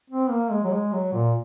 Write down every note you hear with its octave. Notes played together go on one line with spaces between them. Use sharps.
C4
A#3
G#3
F#3
G#3
F#3
A#2